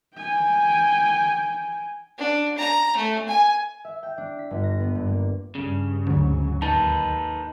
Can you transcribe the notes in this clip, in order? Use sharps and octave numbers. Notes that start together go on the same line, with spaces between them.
G5 G#5
D4
A#5
A3
G#5
E5
G5
D4
B6
G1
A#6
B3
G2
A#3
G2 C#3
D2 G#2 F#3
D#2 D#4 B4 A5